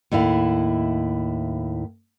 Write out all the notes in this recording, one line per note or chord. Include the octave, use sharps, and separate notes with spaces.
D#2 A2 E4 F5